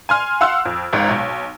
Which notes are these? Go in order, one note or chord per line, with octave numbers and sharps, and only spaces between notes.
G#5 C6 F6
F5 F#5 C6 E6 F#6
F2
G#1 C#2 G#2
B1